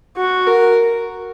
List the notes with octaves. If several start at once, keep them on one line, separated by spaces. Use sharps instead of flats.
F#4
A#4